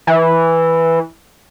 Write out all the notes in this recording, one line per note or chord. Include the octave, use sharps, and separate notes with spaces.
E3